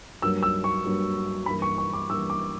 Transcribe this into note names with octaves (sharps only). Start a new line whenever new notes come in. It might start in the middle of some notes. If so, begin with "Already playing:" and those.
G2 F#3 A#3 E6
E6
C#6
G2 F#3 A#3
G2 E3 A#3 B5
C#6
C#6
D6
G2 E3 A#3 E6
D6